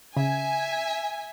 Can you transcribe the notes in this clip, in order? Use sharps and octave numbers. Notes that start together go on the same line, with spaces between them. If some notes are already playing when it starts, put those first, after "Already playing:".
C#3 E5 G#5